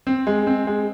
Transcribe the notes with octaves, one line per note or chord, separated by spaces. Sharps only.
C4
G#3
C4
G#3